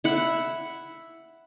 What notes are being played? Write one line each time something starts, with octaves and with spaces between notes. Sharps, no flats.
E4 E5 F#5